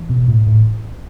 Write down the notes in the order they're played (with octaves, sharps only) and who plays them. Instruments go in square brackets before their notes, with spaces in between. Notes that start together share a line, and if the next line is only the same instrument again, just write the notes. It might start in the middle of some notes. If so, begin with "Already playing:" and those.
Already playing: [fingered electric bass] E3
B2
A2
A2